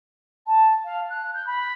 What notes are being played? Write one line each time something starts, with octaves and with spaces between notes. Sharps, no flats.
A5
F5
F#6
G6
B5